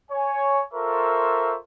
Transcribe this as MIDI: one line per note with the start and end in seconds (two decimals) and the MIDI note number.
0.11 0.62 73
0.11 0.62 80
0.74 1.57 65
0.74 1.57 69
0.74 1.57 70
0.74 1.57 72
0.74 1.57 76
0.74 1.57 85